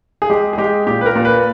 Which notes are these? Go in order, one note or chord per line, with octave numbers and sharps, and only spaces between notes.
G#4
G#3 G4
G#4
G#3 G4
A#2 G4
B4
A#4
A#2
B4